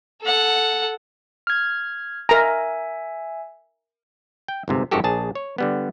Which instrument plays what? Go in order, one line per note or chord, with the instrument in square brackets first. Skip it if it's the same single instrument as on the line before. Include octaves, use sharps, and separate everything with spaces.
[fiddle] A4 F#5
[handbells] F6 G#6
[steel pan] A#4 A#5 [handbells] E5 G#5
[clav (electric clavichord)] G5
G1 G#2 C3
G#1 F#2 D#3 F#4 G4 A4
A#1 G#4 A5
C#5
D3 G3 B3